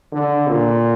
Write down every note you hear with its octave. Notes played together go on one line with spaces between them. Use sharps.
D3
A#2